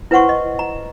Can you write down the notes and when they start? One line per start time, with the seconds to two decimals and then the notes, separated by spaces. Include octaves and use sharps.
0.11 E4 B4 C5 F#5 C6 C#6
0.29 D#5
0.59 A#5